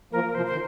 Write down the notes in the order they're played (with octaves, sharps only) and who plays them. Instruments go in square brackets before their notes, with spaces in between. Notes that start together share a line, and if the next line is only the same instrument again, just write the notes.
[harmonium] F3 A#3 [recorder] A#4
[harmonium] C3 F3 [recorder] C5
[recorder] C5
[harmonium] D#3